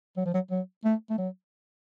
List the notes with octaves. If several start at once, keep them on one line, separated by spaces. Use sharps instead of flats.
F#3
F3
F#3
F#3
A3
A3
F#3